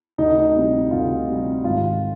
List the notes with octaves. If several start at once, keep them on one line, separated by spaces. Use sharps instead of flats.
D2 D#4
D#4
C3 G3
D2 F4
C3 G3
G#1 F4